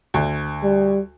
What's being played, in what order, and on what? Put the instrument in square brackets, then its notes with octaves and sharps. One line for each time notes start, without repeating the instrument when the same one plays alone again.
[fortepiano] D2
[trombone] G3